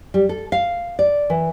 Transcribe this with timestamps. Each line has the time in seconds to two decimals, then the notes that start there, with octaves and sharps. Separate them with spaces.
0.14 G3
0.29 A4
0.52 F5
0.99 D5
1.30 E3